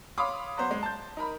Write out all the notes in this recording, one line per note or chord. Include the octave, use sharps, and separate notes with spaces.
C#5 F5 B5 C6 D6 D#6
F#3 B3 C5
G#3
A5 G6
D#4 A#4 B5